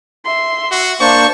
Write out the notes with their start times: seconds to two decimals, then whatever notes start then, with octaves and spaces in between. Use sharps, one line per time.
0.25 E5 C6
0.71 F#4
1.00 A#3 D4 C5 A5 C#6